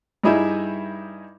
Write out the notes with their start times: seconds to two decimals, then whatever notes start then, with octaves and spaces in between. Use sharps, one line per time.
0.24 G2 G3 D#4 E4 G#4 E5